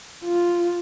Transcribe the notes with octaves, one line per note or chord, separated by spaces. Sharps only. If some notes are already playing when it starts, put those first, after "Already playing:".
F4